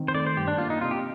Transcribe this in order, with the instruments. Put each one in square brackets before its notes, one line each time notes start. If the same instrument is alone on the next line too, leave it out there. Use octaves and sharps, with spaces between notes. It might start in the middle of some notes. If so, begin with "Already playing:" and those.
Already playing: [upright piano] D#3 C4
[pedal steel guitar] C5
[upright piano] A3 [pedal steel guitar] D5
[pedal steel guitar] C5
[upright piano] G2 [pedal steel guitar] G4
[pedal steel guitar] D4
[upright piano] A#3 [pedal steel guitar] F4
[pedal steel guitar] D#4
[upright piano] C3 [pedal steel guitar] F4
[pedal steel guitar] G4